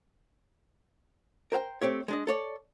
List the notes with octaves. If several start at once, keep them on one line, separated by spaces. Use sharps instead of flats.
A#4 C5 F5 G5
A3 C4 G4 C#5
G#3 D4 D#5
A4 C#5 D5